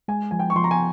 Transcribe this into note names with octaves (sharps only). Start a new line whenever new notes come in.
G#3 G#5
F3 G#5
G5
C#6
F3 C6
A#5
G#5